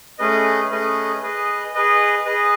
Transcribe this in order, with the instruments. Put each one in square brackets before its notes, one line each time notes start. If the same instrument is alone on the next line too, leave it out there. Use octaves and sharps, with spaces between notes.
[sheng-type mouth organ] A3 C#4 G#4 B4 D#5
A3 C#4 G#4 B4 D#5
G#4 B4 D#5
G#4 B4 D#5
G#4 B4 D#5